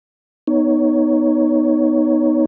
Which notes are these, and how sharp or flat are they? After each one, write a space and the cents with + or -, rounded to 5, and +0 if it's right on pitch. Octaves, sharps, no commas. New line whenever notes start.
B3 +0 D#4 +0 C#5 +10